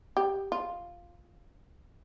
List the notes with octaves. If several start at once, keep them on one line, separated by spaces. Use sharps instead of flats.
G4
F4